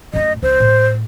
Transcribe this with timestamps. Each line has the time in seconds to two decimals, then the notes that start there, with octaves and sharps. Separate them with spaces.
0.14 F#2 A3 D#5
0.43 C#2 C5
0.60 A2